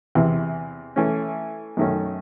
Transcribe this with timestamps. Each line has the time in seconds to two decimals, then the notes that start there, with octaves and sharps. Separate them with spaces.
0.15 E2 C3 E3
0.96 E3 A3 C#4
1.77 F#2 D#3 A3 C#4